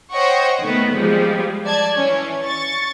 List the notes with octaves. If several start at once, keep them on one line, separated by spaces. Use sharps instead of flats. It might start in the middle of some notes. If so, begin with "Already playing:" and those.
C5 C#5 D#5 F#5 G5 C#6
D#3 A3 B3
F3 G3 G#3
D5 A5 G#6
E3 C#4
C#6 A6